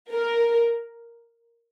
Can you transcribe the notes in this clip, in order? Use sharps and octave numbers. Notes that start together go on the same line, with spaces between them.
A#4